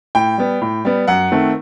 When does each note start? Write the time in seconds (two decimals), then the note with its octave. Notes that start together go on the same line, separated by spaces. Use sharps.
0.15 A2 G5
0.38 G3 B3
0.61 A2
0.85 G3 B3
1.08 F#2 F#5
1.31 D#3 A3 C4